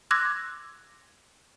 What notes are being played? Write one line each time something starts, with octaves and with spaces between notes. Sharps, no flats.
C6 D6 E6 F#6 G#6 A#6